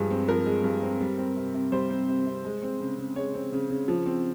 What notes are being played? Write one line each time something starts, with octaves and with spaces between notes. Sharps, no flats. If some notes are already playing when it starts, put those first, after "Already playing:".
Already playing: G2 F3 G#3 G#4
C4
F3 A#4
G#3
G2
C4
G3
C4
C3
C3
G3 C5
C4
C3
C3
G#3
C4
C#3
C#3
G#3 C#5
C4
C#3
C#3
F3
C4